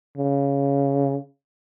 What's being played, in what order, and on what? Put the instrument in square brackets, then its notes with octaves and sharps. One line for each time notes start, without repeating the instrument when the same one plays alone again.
[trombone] C#3